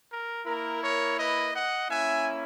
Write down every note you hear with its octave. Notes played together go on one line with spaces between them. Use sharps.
A#4
A#3 E4 A#4
A#4 C#5
B4 D#5
D#5 F#5
A#3 C#4 E4 E5 G#5